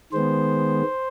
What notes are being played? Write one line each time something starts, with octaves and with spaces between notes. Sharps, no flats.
D#3 G#3 B3 C5